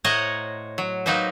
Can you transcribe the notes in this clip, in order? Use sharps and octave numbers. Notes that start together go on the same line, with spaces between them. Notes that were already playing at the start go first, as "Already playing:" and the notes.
A2 C5 C#5 D#5 F#5 A#5
F#3
F#3 A#3 D#4 B4 C5